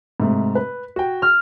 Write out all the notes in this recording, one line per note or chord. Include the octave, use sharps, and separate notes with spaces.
G#2 C3 A3
B4
F#4 G5
F6